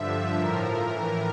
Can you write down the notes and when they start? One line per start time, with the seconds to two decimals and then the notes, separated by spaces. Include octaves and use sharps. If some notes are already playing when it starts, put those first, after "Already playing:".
Already playing: G2 D3 F3 E5
0.34 A2 F3 A#4
0.79 A2 E3